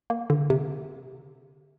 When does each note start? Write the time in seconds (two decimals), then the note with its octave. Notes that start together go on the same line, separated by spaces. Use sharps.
0.10 A#3
0.30 D3
0.50 C3